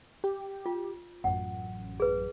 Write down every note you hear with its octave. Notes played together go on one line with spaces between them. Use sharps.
G4
F4
A1 F#2 F#5
G#4 B4